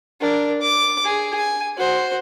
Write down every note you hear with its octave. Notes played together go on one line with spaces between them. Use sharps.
D4 A#4
D6
G#4
G#5
F#4 C5